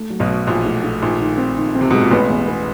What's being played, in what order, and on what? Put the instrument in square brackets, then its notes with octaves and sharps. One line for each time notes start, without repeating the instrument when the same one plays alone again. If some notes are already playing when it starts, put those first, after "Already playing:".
Already playing: [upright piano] A3
F#3
[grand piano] B1 B2
[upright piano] F#4
[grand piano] A#1 A#2 [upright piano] F#3
[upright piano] A3
A3
[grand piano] A#1 A#2 [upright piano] D#3
[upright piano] D#3
C4
D#3
C4
[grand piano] C3
[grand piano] B2 [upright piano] G#3
[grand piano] A#2
[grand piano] A1 A2 [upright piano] B3
[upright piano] E2
B3